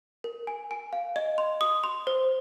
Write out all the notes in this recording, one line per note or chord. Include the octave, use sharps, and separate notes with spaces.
A#4
G#5
G#5
F5
D#5
C6
D#6
C6
C5